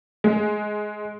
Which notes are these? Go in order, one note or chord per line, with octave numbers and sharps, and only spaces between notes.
G#3